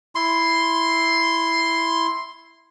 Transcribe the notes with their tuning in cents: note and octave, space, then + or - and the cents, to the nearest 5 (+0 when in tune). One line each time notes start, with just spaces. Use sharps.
E4 +0 C6 +0